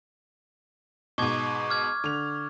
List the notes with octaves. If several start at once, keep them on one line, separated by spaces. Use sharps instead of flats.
G#2 B2 C#6 D6 G#6
D6 F6 G#6
D3 F7